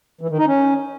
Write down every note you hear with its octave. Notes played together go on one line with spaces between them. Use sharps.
E3
D#3
D#4
C#4